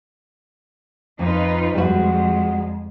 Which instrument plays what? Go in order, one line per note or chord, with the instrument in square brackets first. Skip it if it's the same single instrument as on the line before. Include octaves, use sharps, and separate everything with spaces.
[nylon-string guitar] F2 [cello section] D#4 F4 B4
[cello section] F2 G#3 [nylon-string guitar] G3 F#4